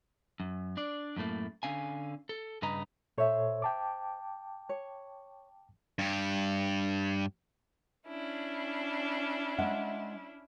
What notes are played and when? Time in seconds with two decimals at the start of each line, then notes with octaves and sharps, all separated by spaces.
0.40 F#2
0.77 D4 D5
1.17 F#2 A2 A3 A#3
1.63 D3 C#4 F5 G#5
2.29 A4
2.62 G2 C#3 B4 D#5 A#5
3.18 A#2 A4 C5 C#5 E5
3.62 G5 A5 D6
4.69 C#5
5.99 G2 G4
8.07 C#4 D4 E4
9.58 G#3 E5 F#5